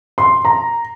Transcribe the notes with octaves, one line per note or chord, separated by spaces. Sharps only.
C6
A#5